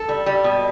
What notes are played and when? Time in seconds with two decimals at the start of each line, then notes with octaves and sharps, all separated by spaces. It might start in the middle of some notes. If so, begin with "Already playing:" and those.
Already playing: A4
0.09 G3
0.26 G3
0.44 B2